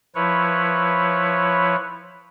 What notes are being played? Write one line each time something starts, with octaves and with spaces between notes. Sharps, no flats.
F3 E4 B4 C#5